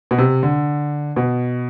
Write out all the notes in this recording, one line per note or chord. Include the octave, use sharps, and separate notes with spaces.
B2
C3
D3
B2